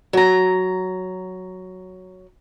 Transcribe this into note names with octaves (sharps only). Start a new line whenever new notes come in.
F#3 A#5